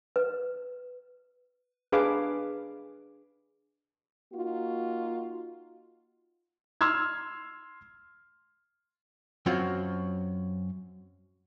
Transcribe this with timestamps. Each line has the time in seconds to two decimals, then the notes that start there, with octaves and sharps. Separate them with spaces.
0.16 B4
1.92 D4 G#4 B4 F5 D6
4.32 A#3 D#4 F4 F#4
6.81 C6 E6 F6 G#6
9.46 F#2 F#3 C4 F4 F#4 C#5